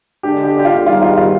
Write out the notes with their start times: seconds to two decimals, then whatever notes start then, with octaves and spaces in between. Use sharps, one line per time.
0.23 D3 G#3 D4 G4
0.44 G4
0.59 G4
0.65 F4
0.86 G#2 D#3 G3 F4
1.02 F4
1.16 F4